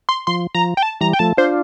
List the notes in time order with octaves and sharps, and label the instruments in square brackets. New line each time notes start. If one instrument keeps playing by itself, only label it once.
[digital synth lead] C6
[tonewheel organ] F3 [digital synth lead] C6
[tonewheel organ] F3 [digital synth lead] A#5
[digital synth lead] G5
A5
[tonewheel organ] E3 G3 [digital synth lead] A#5
[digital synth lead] G5
[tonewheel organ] F3 A3 [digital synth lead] A5
[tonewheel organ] D4 F4 [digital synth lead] C5